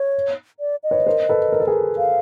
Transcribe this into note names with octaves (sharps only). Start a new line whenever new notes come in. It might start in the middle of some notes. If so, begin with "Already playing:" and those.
Already playing: C#5
D5
D#5
B4 C#5
A#4 C5
A4 B4
A#4
A4
G#4 A#4
F5